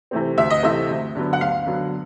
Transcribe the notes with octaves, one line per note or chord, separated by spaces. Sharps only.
C3 E3 A3 C4
D2 E5
D#5
C3 E3 A3 C4 E5
D2
D3 F#3 B3
F#5
D2 F5
D3 F#3 B3